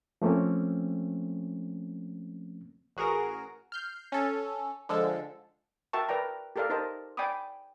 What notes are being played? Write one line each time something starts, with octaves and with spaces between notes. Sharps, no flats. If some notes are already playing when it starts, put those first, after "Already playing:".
F3 A3 A#3 C4 C#4
A1 F#4 G#4 A#4 A#6
F6 G6 C7
C#4 A4
D3 F3 G#3 A4
F#4 A#4 E5 G5 A5 C#6
A#4 B4 D5 G5 A#5
G4 A4 A#4 D5 F5
D#4 G4 A#4 C5 D#5 A5
D5 G5 G#5 B5 D6 D#6